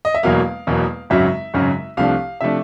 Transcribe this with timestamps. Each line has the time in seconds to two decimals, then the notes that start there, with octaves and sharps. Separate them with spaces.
0.05 D#5
0.15 E5
0.23 E1 E2 B2 F#3 A#3 F5
0.67 E1 E2 B2 F#3 A#3
1.10 G#1 F#2 C#3 F#3 E5
1.54 G#1 F#2 C#3 F#3
1.97 C2 C3 F3 A3 D4 F5
2.41 C3 F3 A3 D4 E5